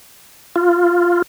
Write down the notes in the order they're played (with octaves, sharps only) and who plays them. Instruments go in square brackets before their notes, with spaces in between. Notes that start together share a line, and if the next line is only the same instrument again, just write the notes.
[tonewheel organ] F4